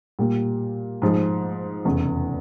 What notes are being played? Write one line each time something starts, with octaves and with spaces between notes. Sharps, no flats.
A#2 G3 A#3
G#2 F3 G#3
F1 E2 C#3